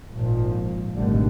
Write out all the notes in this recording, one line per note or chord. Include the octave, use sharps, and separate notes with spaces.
G#1 A#2 F3
G#1 B2 D3 G3 A3